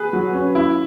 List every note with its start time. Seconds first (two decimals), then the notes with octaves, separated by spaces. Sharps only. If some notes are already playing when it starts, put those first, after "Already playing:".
Already playing: G#4 B4
0.13 F#3
0.33 C#4
0.55 E4